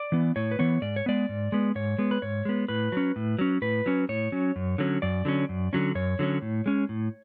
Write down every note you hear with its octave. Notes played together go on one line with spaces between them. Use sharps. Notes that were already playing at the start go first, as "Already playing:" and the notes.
Already playing: D5
E3 B3
A2 C#5
B4
E3 B3 C#5
G#2 D5
C#5
G#3 B3 D5
G#2
G#3 B3
G#2 C#5
G#3 B3
B4
G#2 C#5
G#3 B3
A2 B4
F#3 C#4
A2
F#3 C#4
A2 B4
F#3 C#4
A2 C#5
F#3 C#4
F#2
D3 F#3 C#4
F#2 D5
D3 F#3 C#4
F#2
D3 F#3 C#4
F#2 C#5
D3 F#3 C#4
A2
G#3 C#4
A2